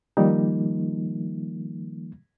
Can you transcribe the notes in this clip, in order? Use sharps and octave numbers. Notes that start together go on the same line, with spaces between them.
D#3 F3 G3 A#3 D#4